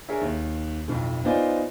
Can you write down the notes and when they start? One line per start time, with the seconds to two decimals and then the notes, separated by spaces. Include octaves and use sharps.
0.09 D4 G#4 A#4 C#5 E5
0.21 D#2
0.88 B1 F2 A2
1.25 B3 D#4 F4 C5 D5 G#5